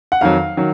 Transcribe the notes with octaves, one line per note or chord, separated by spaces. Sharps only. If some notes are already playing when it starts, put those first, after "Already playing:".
F#5
F2 D#3 F#3 F5
D#3 F#3